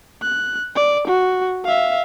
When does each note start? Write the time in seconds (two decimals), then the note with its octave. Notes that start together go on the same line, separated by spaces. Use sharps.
0.22 F#6
0.76 D5
1.08 F#4
1.65 E5 F5